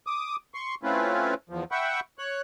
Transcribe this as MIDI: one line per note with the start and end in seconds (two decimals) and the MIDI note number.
0.07 0.36 86
0.07 0.36 87
0.54 0.75 84
0.54 0.75 85
0.83 1.34 57
0.83 1.34 60
0.83 1.34 61
0.83 1.34 64
0.83 1.34 65
0.83 1.34 71
1.50 1.64 40
1.50 1.64 53
1.72 2.00 76
1.72 2.00 78
1.72 2.00 79
1.72 2.00 83
1.72 2.00 85
2.19 2.42 73
2.19 2.42 90